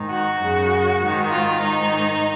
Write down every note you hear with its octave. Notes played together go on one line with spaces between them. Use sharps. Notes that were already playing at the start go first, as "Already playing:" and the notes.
Already playing: G#2 D#3
F#4
F#2 C#3
G#2 D#3
F4
G#2 D#3 D#4